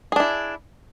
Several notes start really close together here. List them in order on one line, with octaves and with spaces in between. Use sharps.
G#4 D4 E4